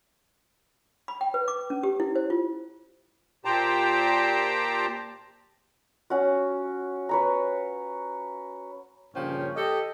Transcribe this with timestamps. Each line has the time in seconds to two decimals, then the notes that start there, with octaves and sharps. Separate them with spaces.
1.08 B5
1.21 G5
1.34 B4
1.48 D6
1.70 C#4
1.83 G4
2.00 E4
2.15 C5
2.30 F4
3.45 A#2 G4 C5 G5 A5 A#5
6.10 C#4 F#4
7.09 B4 C#5 A#5
9.14 G2 A#2 C#3 F3 C#4 G5
9.56 G4 A4 D#5